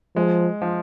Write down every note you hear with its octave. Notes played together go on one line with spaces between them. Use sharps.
F3 G#3
F3